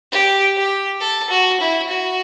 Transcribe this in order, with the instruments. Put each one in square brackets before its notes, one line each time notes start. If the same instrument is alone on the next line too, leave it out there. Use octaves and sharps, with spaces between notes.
[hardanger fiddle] G4
G4
A4
F#4
E4
F#4